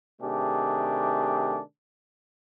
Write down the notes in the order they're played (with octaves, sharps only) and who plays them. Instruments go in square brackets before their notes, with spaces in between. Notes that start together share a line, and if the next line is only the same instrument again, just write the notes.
[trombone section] C3 D#3 A3 D4 G4 G#4